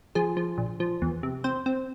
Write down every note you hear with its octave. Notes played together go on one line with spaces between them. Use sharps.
F3 G#4
F3
A#1
F3
E2
C3
C4 C5
C4